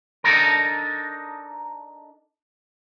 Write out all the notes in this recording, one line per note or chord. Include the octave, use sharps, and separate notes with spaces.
D4 D#4 A4 A#4